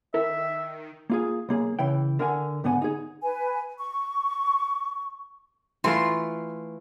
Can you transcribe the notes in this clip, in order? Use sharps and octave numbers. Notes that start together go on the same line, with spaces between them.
D#3 E4 A4 A#4 E5
A#3 F4 G#4
B1 A#3 G#4
C#3 E3 G5
D3 A#4 F#5 G#5
G#2 D3 B3 F#5 G#5
D#4 G#4
B4 G#5
C#6
E3 A3 F4 C6